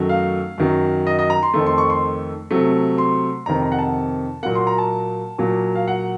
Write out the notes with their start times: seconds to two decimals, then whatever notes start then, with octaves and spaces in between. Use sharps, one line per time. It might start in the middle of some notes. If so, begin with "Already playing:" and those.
Already playing: F#2 D#3 F#3 A3
0.09 F5
0.58 F#2 D#3 F#3
1.07 D#5
1.19 D#5
1.30 A#5
1.43 C6
1.54 F2 D#3 A3
1.67 C6
1.78 C#6
1.90 C6
2.51 C3 F#3 A3
2.98 C6
3.46 F2 C3 D#3 A#5
3.62 A#5
3.72 F#5
3.79 A5
4.43 A#2 F#3 A#3 F#5
4.55 C6
4.67 A#5
4.78 A5
5.39 A#2 F#3 A#3
5.75 F5
5.88 F#5